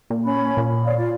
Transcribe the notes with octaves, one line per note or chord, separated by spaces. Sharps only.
A#2
C#4 B5
A#2
C#5 D5 F5
F4 D5